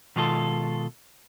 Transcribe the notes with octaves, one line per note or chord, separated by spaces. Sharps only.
B2 D#3 G#3 F4 A4